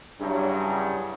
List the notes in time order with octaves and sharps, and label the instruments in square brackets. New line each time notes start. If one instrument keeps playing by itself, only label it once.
[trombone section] G2 C#3 [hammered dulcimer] F#3 E4